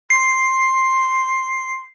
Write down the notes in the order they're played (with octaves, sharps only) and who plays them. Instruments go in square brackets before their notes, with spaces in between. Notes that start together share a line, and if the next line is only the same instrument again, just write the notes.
[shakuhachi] C6 [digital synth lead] C7